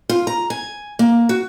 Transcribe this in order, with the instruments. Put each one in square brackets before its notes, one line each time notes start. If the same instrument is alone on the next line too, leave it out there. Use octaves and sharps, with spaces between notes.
[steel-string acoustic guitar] F4
A#5
G#5
A#3
F#4